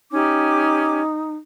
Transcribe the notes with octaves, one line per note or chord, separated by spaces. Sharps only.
C#4 D#4 G4 D6